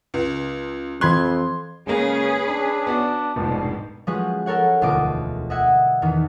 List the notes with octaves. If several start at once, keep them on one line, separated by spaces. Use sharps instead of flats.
C#2
F2 E3 B5 C6 F#6 G#6
C#3 G#3 A#3 C#4 G#4 B4
D4 B5
B3 F#4 D5
F1 G#2 B2 F3
F3 G#3 C#4 F#4 G#4 B4
A4 A#4 C#5 F#5
E1 D2 B2 F4 D#5 D6
D#5 E5 F#5 G#6
E2 D#3 E3